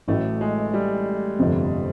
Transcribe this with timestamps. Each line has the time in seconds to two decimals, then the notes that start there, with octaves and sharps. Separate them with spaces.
0.08 A1 A2 F#3 A3
0.41 G#3
0.74 G3
1.39 G1 F2 C3